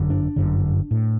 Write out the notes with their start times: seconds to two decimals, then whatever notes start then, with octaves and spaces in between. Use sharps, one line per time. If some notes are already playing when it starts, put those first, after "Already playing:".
Already playing: G1 F#2 D3
0.10 D4
0.36 G1 F#2 D3
0.91 A2